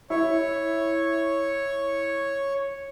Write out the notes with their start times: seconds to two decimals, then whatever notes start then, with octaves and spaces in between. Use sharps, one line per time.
0.10 E4 C#5